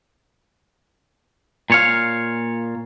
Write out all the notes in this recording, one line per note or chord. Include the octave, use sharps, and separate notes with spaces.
A#2 C#5 F5